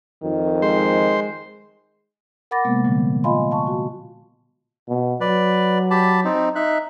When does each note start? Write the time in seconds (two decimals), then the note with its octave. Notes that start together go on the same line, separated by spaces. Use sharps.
0.23 F2 D#3
0.62 G#3 C5
2.51 A#4 F#5 B5 D6 A6 A#6
2.65 C3 G#3 A#3 B3
2.84 A#2 D3 F3 G3 B3
3.24 F4 D#5 F5 G#5 B5 C6
3.51 F5 A5 C#6
3.67 F#4
4.89 B2
5.21 F#3 B4 D5
5.91 G4 A5 B5
6.25 C4 D#4
6.55 D#4 E5 F#6